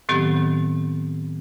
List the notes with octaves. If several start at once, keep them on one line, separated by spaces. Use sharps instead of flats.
A2 D#3 F#3 B3 C4 G4